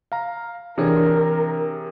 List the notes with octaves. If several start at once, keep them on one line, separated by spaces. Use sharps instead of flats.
F5 A#5
C3 E3 D4 G#4 A#4 C#5